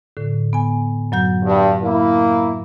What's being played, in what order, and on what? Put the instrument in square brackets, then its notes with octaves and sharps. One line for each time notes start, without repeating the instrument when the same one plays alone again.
[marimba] A2 D3
B3 G#5
F#2 F#3 G6
[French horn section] G2
A#3 E4